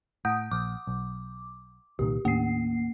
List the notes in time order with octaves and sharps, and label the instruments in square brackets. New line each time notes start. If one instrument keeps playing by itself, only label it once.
[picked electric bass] A2 [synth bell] F#5 D#6 G6
[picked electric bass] A#1 [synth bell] D6
[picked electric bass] B1
[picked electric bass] C2 A#2 D#3 [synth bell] G4
[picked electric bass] D#2 A2 [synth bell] A#3 C7